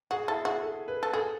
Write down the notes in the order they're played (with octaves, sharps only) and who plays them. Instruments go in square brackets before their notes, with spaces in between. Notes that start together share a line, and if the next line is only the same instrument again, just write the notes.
[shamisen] F#4 [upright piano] G#4
[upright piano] E4 [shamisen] A4
[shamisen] F#4 [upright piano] G#4
[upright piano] A4
B4
[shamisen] A4
[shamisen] G#4 [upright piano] A4